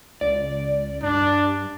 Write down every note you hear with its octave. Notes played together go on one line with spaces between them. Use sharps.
C#2 D5
G2 D4